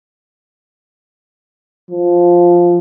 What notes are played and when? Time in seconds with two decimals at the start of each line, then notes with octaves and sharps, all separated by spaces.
1.91 F3